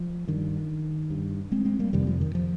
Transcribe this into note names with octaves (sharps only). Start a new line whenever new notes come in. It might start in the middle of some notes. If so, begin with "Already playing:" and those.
Already playing: F3
G2 D#3
G2
G#3 C4
G#3 C4
G3 A#3
F2 C3 D#3 G3
F3
D#3
F3